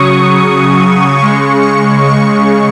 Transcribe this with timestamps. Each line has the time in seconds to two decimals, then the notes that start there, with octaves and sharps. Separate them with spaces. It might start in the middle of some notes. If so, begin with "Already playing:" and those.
Already playing: C#3 F#3 C#6 D#6
1.18 C#3 G#3 C#6
1.62 C#6
2.05 C#6